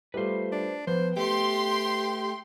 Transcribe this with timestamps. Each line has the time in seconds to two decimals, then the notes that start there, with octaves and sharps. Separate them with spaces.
0.14 G3 A3 F4 B4 C5
0.52 D4
0.87 F3 B3 C5
1.17 A3 G4 G5 C6